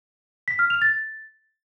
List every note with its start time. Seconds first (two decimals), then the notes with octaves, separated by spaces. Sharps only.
0.48 B6
0.59 F6
0.70 F7
0.82 A6